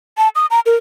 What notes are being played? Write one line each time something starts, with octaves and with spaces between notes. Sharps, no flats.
A5
D#6
A#5
A#4